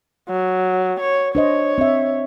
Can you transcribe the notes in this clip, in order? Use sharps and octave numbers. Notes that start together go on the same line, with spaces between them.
F#3
C#5
D4 C5 C#5 D#5
C4 E5